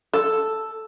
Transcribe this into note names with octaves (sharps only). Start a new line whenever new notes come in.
A4